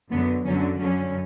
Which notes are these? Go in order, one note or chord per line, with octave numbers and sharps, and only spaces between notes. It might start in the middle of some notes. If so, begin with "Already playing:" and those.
F#2 D3 F#3 B3
F#2 D3 F#3 C#4
F#2 D3 F#3 C#4